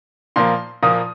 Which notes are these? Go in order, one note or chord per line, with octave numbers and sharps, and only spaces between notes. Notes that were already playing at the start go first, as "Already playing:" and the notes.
A#2 F3 A#3 C6
A#2 F3 A#3 D#6